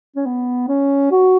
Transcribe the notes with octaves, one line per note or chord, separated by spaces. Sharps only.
C#4
B3
C#4
F#4